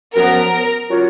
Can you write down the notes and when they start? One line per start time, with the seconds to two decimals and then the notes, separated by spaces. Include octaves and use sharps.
0.15 F#2 F3 B3 A#4
0.88 F#3 C#4 F4 A#4 C#5